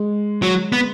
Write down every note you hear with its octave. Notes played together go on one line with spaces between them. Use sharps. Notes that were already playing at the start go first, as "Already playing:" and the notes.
Already playing: G#3
F#3
B3